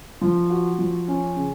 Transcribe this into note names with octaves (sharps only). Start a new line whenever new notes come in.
F3
F#4
F3
C#4
C#3